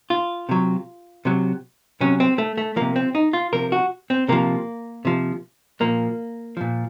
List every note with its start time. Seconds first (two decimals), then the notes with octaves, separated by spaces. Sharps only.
0.10 F4
0.49 C3 F#3
1.25 C3 F#3
2.01 C3 F#3 C#4
2.20 C4
2.38 A3
2.58 A3
2.76 C3 F3 A#3
2.96 C4
3.15 D#4
3.33 F4
3.53 C3 F3 A#4
3.72 F#4
4.10 C4
4.28 C3 F3 A#3
5.05 C3 F3
5.80 A#2 F3 A#3
6.57 A#2 F3